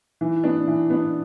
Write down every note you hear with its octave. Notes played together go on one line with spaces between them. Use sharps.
E3
B3 D4
E3
B3 D4